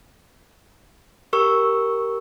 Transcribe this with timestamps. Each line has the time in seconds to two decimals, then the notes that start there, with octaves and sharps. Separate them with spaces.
1.33 G4 A#4 C#6 E6